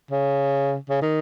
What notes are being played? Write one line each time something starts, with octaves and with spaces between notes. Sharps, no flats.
C#3
C#3
D#3